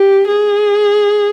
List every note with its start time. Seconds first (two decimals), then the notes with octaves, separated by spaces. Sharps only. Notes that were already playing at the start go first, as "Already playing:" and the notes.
Already playing: G4
0.28 G#4